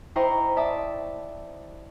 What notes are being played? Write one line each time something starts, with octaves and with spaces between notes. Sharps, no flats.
E4 C5 D#5 G5 A#5 C#6
D5 E5 A5 D#6